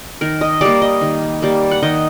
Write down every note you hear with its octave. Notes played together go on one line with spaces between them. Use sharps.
D#3 A#4
D#5
G3 A#3 D5
D#5
D#3
G3 A#3
F#5
D#3 D#5